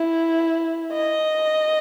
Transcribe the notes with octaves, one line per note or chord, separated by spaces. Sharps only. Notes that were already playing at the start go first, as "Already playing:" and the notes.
Already playing: E4
D#5